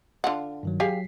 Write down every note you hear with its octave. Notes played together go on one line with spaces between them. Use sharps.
D3 F4 F#5
G2 D#3 F#3
F#3 G4 G#4 F5 B6 C7